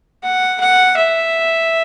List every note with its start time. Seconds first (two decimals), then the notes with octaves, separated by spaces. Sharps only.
0.23 F#5
0.60 F#5
0.97 E5